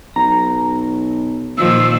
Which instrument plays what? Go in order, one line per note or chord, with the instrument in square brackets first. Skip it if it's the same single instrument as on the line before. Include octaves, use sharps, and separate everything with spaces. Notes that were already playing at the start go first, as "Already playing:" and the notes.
[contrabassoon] B1 [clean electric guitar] A#5
[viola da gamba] A#2 D#3 F3 [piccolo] E6